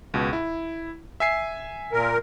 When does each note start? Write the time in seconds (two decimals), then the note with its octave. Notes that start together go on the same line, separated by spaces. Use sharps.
0.14 C#2 B2
0.33 E4
1.20 E5 G#5 C7
1.92 A#2 A#4